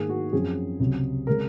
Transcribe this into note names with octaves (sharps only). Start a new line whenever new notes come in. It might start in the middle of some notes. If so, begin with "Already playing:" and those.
Already playing: G#2 D#3 A#3 G#4
F#4
F#2 F3 C4 G#4
C#2 C3 F#3
C#3 G#3 C4 A#4